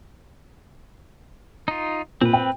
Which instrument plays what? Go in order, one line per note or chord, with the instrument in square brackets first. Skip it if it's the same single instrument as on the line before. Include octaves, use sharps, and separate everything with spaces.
[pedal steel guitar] D#4 F4
[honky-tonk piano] A#2 [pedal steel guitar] C4 B4
[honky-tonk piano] G5